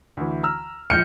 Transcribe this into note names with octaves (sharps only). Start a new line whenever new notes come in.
D2 E3
A#5 E6 F6
A#1 F6 G6 C#7